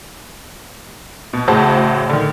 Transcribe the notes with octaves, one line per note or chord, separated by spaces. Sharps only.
B2
A1 A2 C#3 F#4 C5 A5
D3 D#3